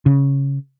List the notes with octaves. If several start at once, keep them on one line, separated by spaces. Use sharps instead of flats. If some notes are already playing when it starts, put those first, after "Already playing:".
C#3